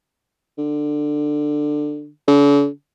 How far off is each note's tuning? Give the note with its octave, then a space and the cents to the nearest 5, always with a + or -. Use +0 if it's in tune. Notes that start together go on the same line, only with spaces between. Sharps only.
D3 +15
D3 -45